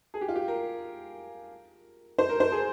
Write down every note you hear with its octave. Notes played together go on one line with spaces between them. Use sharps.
G#4
G4
F4
G4
A#4
C5
A#4
C5
G#4